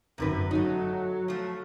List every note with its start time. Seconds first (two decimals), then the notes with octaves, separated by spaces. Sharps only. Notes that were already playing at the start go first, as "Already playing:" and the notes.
0.18 G1 F#2 C3 D#3 B4
0.51 F#3 A3 D#4
1.28 F3 A3